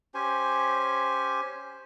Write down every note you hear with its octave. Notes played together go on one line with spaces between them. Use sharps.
C#4 G4 C5 G#5